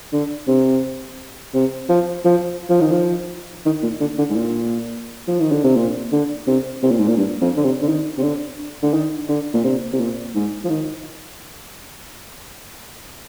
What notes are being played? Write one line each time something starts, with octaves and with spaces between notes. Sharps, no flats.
D3
C3
C3
F3
F3
F3
D#3
F3
D#3
A#2
D3
D3
G#2
A#2
F3
D#3
D3
C3
A#2
D3
C3
C3
A#2
G#2
A#2
G2
F2
D3
C3
D3
D#3
C3
D3
D3
D#3
D3
A#2
C3
C3
A#2
G#2
F3
D#3